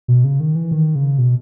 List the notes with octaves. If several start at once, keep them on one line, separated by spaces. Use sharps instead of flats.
B2
C#3
D#3
E3
D#3
C#3
B2